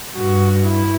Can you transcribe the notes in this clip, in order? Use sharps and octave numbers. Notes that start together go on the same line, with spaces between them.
G2 F#4
E4